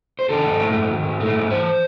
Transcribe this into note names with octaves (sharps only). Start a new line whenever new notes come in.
C5
D#3 A4
G#2
A3
G#2
D#3
G#2
A3
G#2
E3 C5